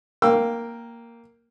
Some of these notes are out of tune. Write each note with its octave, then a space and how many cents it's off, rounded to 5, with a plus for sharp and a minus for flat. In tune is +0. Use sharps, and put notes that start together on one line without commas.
A#3 +0 G5 +0 E6 +20